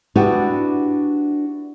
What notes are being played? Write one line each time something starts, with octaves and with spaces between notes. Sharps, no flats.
B3 D4 E4 F#4 G4